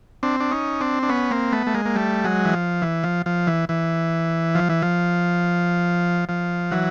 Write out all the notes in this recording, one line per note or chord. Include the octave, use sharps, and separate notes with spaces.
C4 D4
D4
C#4 D#4
C4 D4
D4
B3 C#4
A#3 C4
A3 B3
A3
G#3 A#3
A#3
G3 A3
F#3 G#3
E3
F3
E3
F3
F3
E3
E3
F3
E3
F3
F3
E3 F#3